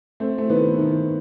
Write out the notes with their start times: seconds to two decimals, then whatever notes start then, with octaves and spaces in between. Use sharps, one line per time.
0.20 A3 C4
0.38 A3
0.50 D#3 B3
0.78 D#3